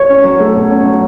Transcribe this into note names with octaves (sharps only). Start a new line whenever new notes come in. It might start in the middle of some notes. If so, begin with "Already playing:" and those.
Already playing: C#5
C#4
F#3
A3
B2
C#4
F#3